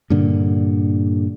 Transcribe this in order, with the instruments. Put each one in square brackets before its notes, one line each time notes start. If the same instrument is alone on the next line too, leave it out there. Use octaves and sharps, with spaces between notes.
[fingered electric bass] G2 A#2 D3